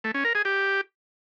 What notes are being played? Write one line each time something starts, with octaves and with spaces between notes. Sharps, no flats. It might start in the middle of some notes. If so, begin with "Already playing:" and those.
A3
C#4
A#4
G#4
G4